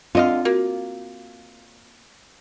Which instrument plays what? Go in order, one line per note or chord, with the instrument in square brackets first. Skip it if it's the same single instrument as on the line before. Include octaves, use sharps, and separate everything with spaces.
[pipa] D3 D#5 F5 [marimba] C4 [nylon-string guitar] F4
[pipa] A#3 [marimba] F#4